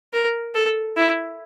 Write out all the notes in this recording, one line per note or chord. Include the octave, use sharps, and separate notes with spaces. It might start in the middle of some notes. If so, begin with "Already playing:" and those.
A#4
A4
E4